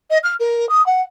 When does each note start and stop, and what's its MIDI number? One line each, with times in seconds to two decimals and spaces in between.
0.10 0.18 75
0.23 0.34 89
0.39 0.68 70
0.69 0.84 87
0.86 1.01 78